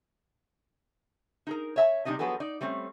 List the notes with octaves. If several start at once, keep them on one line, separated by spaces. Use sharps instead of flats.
D#4 G#4 A#4
C#5 E5 A5
C3 G3 D4 D#4 D#5
F3 F#3 B3 G#4 A4
D#4 D5
G3 A3 C4 C#4